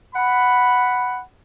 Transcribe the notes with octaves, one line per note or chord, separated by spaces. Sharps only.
F#5 B5